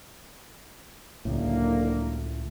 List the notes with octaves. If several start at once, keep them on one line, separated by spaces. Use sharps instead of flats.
F#1 C#2 A2 D3 A#3